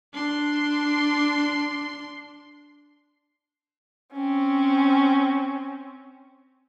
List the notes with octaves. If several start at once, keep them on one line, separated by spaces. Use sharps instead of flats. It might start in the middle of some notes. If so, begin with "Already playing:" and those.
D4 C6
C4 C#4